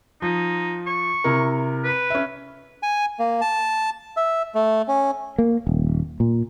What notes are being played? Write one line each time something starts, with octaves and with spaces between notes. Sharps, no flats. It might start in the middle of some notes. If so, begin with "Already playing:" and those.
F3 D#4
C#6
C3 E4 A#4
B4
C#4 E5
G#5
A#3
A5
E5
A3
C#4
A#3
D#1
A#2